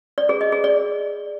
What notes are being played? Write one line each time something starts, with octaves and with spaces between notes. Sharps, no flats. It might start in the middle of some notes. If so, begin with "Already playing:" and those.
D5
G#4
D#5
G#4
D5